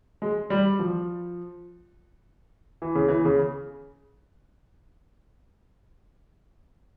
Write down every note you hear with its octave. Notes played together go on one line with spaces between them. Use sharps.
G#3
G3
F3
E3
C#3
E3
C#3